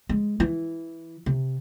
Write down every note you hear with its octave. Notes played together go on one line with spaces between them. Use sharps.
G#3
E3
C3